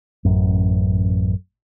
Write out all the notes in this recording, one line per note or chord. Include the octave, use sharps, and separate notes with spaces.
A1 F#2